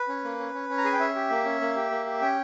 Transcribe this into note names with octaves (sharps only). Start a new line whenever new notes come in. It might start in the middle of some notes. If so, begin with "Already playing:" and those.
Already playing: B4
C#4
A#3
C#4
C#4
C#4
A#5
G#4 G#5
G5
C#4 E5
G4
A#3
C#4
A#3
G4
A#3
G4
C#4 G5